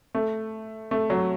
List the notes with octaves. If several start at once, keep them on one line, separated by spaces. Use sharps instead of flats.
A3
A3
F#3